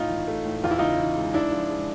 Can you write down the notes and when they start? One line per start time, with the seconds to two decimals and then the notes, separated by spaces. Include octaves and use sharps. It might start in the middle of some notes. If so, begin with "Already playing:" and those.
Already playing: A2 D#4 F4
0.10 E3
0.28 A3
0.45 A2
0.64 E2 F4
0.71 E4
0.78 C#3 D#4 F4
0.99 E3
1.17 G#3
1.34 G#2 D4 E4
1.52 F3
1.70 G#3